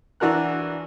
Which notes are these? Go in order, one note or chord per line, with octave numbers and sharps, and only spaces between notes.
E3 D4 F#4 A#4 F#6